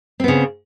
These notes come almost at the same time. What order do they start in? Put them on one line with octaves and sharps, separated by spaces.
C4 B3 C#3